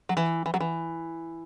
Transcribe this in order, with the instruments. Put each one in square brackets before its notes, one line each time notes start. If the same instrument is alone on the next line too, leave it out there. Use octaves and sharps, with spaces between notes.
[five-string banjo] F#3
E3
E3
F#3
E3